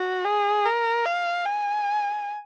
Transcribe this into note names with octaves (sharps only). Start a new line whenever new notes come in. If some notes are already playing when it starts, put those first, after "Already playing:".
Already playing: F#4
G#4
A#4
F5
G#5